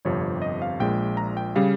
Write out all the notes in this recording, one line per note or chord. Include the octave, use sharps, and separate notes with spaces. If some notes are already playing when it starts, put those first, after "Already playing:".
G1 F2 C3 F3 C#5
D#5
F5
A#1 A#2 G#3 G5
A#5
G5
C#3 G3 F5